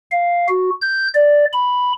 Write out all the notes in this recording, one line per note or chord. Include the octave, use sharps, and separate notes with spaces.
F5
F#4
G6
D5
B5